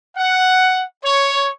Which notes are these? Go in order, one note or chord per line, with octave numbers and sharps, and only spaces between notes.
F#5
C#5